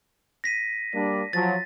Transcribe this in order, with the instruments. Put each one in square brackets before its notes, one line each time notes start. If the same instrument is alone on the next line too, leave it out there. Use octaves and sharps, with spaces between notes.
[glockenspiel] A#6 B6 D#7
[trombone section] G3 A#3 D4
[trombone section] F3 F#3 [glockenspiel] A6